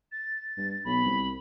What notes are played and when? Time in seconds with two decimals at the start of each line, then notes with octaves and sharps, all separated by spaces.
0.12 A6
0.57 G2
0.85 B1 B5
1.05 C2